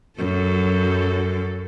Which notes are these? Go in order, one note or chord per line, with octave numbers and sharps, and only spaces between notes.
F#2 F#3 A4